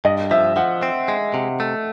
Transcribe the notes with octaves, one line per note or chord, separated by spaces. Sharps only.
G2 D#5
F3 E5
F3 F#5
C4
G#3
C3
A3